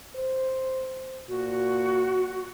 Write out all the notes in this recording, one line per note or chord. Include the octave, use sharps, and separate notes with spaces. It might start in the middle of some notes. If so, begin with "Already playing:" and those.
C5
A#2 F#4